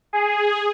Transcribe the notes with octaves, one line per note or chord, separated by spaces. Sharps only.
G#4